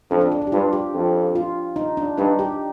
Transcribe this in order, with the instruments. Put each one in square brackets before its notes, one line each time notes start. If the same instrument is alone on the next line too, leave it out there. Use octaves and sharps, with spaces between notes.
[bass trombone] F2 [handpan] D4
[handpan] D4
D4
D4
G4
[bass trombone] G2 [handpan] F4
[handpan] G4
[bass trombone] F2
[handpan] F4
D#4
D4
[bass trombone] G2 [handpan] D#4
[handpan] G4